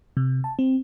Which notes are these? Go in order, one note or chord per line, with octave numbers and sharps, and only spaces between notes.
C3
A5
C4